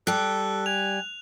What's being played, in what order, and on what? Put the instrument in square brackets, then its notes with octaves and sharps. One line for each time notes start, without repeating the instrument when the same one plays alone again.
[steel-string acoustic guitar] G3 G4 [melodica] A4 [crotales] F#6
[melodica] G#5 [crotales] F7